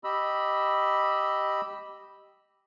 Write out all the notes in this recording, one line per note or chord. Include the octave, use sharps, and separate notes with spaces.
G4 D#5 B5 E6